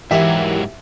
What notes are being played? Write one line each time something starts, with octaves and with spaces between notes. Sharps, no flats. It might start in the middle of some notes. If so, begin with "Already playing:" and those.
G#2 E3 F#3 E4 G4 A#4 E5